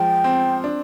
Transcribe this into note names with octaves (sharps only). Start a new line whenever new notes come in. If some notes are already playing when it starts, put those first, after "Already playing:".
Already playing: F3 G#3 G5
C4
D4